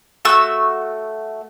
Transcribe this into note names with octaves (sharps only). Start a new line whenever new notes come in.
A3 F#4 C#6 E6